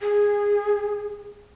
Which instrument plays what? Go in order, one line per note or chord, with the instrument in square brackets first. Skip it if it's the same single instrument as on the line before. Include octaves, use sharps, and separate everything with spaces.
[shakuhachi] G#4